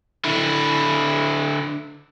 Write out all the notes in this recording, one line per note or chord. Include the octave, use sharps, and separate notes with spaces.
D3 E4